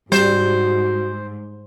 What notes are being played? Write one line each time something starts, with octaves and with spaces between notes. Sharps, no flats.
G#2 G3 F#4 C5